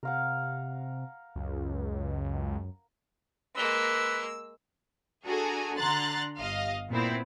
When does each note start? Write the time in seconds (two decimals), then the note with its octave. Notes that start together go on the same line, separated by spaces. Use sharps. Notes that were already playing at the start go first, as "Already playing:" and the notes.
0.03 C3 A#4 F5 F#5
1.35 C#2 F#2
3.56 G#3 A#3 B4 E6
5.25 D4 F#4 G#4 A4 G#5 A#5
5.77 D3 A#5 C6 F#6 A6
6.39 G1 D#5 F5
6.91 A#2 B3 C4 E4